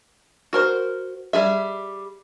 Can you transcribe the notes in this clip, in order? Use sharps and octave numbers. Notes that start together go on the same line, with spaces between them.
F#4 A#4 C5
G3 G#4 E5